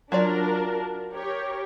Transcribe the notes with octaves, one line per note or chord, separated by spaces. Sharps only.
F#3 D4 F4 A#4 D5
G4 A#4 C#5